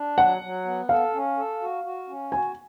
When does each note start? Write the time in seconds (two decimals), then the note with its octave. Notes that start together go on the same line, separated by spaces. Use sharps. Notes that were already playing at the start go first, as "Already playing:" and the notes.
Already playing: D4
0.18 F#3 F#5
0.42 F#3
0.65 B3
0.89 A4 F5
1.13 C#4
1.37 A4
1.61 F#4
1.84 F#4
2.08 C#4
2.32 F#4 G#5